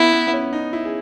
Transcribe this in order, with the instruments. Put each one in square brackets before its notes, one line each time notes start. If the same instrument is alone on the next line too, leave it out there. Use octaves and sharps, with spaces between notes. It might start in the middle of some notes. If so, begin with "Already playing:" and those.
Already playing: [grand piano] B3 [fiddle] E4
[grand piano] B3
B3
C#4
D#4
E4
G#4